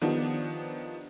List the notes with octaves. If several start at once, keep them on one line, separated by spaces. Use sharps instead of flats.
D#3 F3 B3 D4 G4